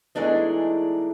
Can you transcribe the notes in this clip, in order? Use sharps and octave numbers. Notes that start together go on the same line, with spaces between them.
E2 E3 G#3 A3 D4 D#4